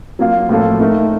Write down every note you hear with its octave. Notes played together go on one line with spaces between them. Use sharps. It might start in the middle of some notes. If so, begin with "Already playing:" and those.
F#3 A#3 F4
A2 F3 A#3 F4 A4
A3 D#4 A#4